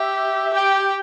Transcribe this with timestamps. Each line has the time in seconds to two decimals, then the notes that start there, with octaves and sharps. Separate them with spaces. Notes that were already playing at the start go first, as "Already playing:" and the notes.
Already playing: G4 E5
0.45 E5
0.54 G4 G5